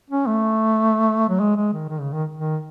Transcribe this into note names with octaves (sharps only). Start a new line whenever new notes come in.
C#4
A3
F#3
G#3
G#3
D#3
D#3
C#3
D#3
D#3